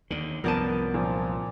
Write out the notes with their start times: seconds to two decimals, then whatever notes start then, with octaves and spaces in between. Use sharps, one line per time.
0.11 D#2 D3
0.44 C2 F#2 F3 B3 A#4 D5 A5 D#7
0.94 A#2 F3